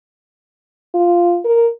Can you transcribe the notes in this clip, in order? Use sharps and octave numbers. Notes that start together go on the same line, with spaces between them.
F4
A#4